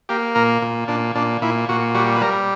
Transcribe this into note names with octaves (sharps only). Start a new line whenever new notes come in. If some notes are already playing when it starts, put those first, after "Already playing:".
A#3 G4
A#2 A#4
A#2
A#2 D4
A#2 D4
A#2 E4
A#2 F#4
G3 F#4
B4
G3 A#4